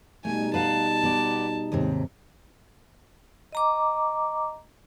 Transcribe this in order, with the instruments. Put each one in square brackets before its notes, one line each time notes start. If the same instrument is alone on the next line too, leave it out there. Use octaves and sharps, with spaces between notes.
[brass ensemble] B2 G3 D#4 [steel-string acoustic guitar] A3 [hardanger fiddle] G#5
[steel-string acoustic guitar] B4 F5 F#5 [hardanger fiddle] A5
[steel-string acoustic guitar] B3 D5
D#2 G#2 C3
[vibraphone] D#5 A#5 D6